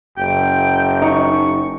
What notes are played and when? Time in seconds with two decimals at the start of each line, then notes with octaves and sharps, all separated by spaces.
0.18 F#1 G5
1.02 D#4 C#6